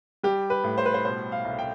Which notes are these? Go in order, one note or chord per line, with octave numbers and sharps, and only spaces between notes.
G3 G4
B4
A2
C5
B4
C5
B2 C5
F5
C2
G5